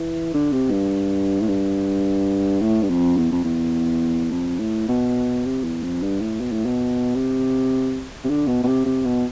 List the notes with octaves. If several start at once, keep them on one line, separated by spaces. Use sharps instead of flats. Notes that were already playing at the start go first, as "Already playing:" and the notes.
Already playing: E3
D3
C3
G2
A2
G2
A2
G2
F2
E2
F2
E2
F2
A2
B2
C3
E2
F2
G2
A2
B2
A2
B2
C3
C3
D3
B2
B2
C3
C3
B2